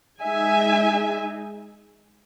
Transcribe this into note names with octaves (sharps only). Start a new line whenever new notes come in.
G#3 D#4 E5 G#5